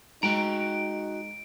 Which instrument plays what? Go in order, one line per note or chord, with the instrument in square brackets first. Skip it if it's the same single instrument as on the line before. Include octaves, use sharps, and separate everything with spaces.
[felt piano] G#3 [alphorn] D#4 [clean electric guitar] F#4 G5 A#5 [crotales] D7